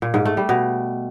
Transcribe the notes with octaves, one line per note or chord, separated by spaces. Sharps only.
A#2
G#2
A3
G3
B2